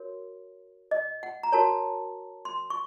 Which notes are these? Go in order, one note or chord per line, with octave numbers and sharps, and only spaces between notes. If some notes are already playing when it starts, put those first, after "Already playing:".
Already playing: F#4 A#4 C#5
D#5
F#5
A#5
F#4 A#4 C#5 A5
C6
C#6